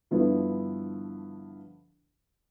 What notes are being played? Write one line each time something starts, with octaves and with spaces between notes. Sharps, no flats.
G2 D3 F3 B3 E4